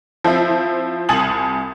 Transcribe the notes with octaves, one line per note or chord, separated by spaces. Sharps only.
F3 C4 E4
C2 G#5 A5 D#6 A6 F#7